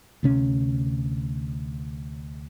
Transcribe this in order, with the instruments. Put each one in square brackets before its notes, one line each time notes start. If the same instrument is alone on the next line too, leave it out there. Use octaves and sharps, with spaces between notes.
[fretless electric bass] D2 C3 C#4